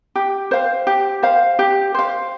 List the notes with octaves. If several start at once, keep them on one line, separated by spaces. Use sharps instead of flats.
G4
C5 F5
G4
C5 F5
G4
C5 F5